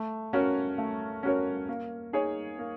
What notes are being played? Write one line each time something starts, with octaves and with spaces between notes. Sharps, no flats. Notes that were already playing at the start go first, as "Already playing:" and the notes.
Already playing: A3
C#4 F#4 A#4 C#5
A3
C#4 F#4 A#4 C#5
A#3
D#4 G#4 C#5
A#3